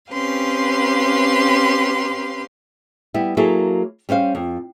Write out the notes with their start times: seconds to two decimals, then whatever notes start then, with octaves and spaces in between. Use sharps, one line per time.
0.10 C4 C#4 G4 B4 F5 C6
3.14 G3 B3 E4
3.37 F#3 A#3 E4 G#4 A4
4.09 G3 C#4 C5 F5
4.35 F2